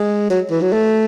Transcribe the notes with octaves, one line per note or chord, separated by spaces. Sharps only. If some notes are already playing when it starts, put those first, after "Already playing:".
Already playing: G#3
F#3
E3
F#3
A3